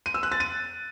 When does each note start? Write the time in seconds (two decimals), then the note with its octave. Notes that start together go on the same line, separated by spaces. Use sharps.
0.06 D#7
0.14 E6
0.23 F#6
0.32 A6
0.40 D#7